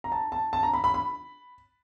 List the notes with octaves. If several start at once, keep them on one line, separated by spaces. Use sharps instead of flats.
A#5
A5
A5
A5
A#5
B5
B5
B5